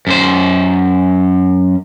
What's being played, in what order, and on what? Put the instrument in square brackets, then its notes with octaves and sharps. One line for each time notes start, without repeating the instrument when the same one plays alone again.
[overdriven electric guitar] F#2 C5